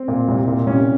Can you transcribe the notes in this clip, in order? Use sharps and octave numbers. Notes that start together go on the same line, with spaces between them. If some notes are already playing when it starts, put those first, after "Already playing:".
Already playing: C4
A#2
C2
A#2
C2 C#4